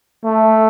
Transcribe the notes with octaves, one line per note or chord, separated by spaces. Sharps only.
A3